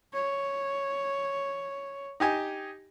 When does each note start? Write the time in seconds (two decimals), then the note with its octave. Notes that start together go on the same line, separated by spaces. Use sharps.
0.13 C#5
2.20 D#4 G4 G#5